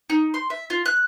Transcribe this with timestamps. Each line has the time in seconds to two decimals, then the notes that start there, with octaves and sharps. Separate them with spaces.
0.10 D#4
0.34 C6
0.50 E5
0.70 F4
0.85 F#6